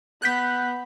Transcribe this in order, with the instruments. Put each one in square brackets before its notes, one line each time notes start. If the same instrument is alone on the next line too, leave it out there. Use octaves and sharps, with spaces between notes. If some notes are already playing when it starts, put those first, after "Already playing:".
[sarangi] B3 [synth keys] F#6 G6 B6